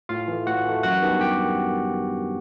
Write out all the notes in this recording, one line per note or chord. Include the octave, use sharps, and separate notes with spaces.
A2 F4 F5
E3 A3
A2 F#4 F#5
E3 A3
F#2 F#4 F#5
D#3 G3 B3 D4
G4 G5